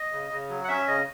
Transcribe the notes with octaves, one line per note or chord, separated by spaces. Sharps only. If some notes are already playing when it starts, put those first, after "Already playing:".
Already playing: D#5
C#3
C#3
F#3
F#5
C#4 E5
C#3 D#5